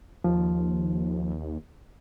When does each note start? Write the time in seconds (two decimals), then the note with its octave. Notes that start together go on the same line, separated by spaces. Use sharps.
0.24 D#2 F3